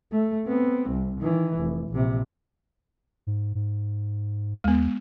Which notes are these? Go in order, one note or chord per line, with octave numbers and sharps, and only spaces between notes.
A3
B3 C4
C2
D#3 E3
F1
A#1 C3
G#2
G#2
D#2 G#3 B3